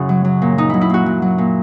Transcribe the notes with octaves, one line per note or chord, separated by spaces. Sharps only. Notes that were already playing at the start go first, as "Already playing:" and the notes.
Already playing: F#2 C#3 E4 F#4
F#3
F#3
A#2
F#3 D#4
F#3 E4
E4
A#2 F#4
F#3
F#3
A#2